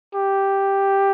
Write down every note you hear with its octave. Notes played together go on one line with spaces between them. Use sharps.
G4